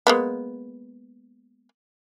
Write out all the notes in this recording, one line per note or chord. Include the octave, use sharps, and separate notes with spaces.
G#3 A#3 B3